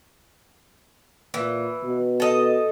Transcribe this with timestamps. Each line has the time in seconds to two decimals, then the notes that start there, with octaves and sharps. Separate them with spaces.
1.34 A#2 E3
1.84 B2
2.20 A4 D#5